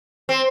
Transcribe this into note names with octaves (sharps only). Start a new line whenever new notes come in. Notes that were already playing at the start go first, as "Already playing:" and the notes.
C4